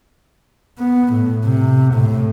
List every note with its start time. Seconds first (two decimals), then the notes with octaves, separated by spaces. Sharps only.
0.79 B3
1.12 A2
1.44 C3
1.94 A2